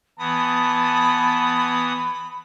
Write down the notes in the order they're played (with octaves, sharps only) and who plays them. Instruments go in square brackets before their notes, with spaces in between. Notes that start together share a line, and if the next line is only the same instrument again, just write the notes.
[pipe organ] E3 B3 D#6 [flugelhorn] A5 [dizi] B5